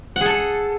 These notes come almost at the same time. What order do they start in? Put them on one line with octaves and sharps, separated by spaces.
F#5 G#4 A4